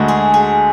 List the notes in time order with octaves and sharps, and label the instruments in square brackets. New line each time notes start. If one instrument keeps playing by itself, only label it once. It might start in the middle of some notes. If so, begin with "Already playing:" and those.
Already playing: [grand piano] D2 D3 G#3 [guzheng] F#4
[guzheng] G#4
G#4